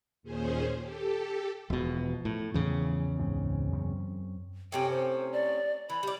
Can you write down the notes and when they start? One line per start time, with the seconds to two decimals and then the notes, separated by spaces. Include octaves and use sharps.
0.23 D#2 A#2 C#4 G#4 C5
0.77 G4 A4
1.70 E1 B2 F3
2.25 A2
2.54 E2 A2 C#3 E3 F3
3.19 C#2 G#2 C4
3.72 F#2 C4 C#4
4.72 A2 C3 C#4 G5
4.91 C5
5.33 D5
5.90 E3 B5
6.03 G3 D5